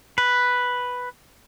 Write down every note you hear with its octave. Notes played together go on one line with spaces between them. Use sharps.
B4